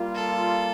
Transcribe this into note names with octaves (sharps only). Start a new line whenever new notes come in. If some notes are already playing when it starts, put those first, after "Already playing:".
Already playing: G3 A#3 F4
A4